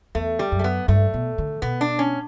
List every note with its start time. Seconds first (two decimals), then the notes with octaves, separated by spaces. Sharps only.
0.15 E2 A3
0.39 G3
0.52 F#2
0.59 A3
0.64 B3
0.88 G2 A3
1.14 B2
1.38 D3
1.62 B2 B3
1.81 D4
1.99 C#4